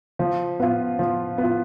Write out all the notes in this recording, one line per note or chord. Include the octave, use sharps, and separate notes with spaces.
F3
B3 F4
F3
B3
F4